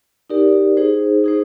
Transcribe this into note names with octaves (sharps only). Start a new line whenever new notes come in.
D#4 G4 A#4 D5
D#4 G#4 C5
D#4 G#4 C5